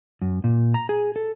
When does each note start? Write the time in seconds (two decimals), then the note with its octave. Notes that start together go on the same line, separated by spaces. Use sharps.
0.22 F#2
0.44 A#2
0.74 A#5
0.89 G#4
1.16 A4